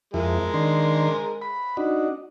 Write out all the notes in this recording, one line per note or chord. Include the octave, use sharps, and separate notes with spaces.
F2 G#3 E4 A#4
D#3 D4 C6
B5
D4 D#4 F#4